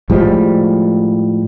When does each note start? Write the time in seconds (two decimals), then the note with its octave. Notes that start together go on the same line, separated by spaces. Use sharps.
0.10 A2 F3 G3 G#3